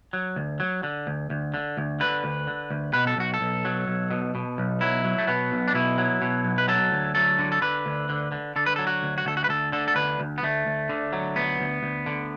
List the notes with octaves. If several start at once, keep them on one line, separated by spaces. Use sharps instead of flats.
F#3
D2
F#3
D3
D2
D2
D3
D2
D3 B4
D2
D3
D2
B2 B4
A4
B1 F#4
A4
B1
F#3
B1
B2
B2
B1
F#3 E4
F#3
A3
B2 B3
B1
D4
B2 E4
F#3
B2
B1
B4
F#3 A4
D2
F#3 A4
D3
A4
D3 B4
D2
D3
D3
D3 A4
B4
F#3 A4
F#4
D2
F#4
D2 A4
F#4
B4
D2 A4
D3 A4
A4
D2 B4
D2
B3
D2 A3
D2
D3
F#3
D2 B3
D2
D2
D3